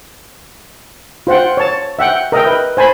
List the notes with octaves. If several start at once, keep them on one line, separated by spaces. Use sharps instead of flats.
F4 C5 F#5 G5
C#5 A5
E5 F#5 G5
A#4 D#5 E5 G5
B4
C5 G#5 A5 B5